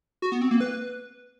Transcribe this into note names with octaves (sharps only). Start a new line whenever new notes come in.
F#4
B3
C4
A#3
B4